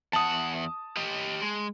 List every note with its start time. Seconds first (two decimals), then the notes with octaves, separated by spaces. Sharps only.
0.13 E2 F#5 A5 D#6
0.97 G4 D#5
1.42 G#3